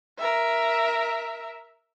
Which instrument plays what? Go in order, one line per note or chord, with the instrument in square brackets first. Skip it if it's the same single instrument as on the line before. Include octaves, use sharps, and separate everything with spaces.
[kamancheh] A#4 E5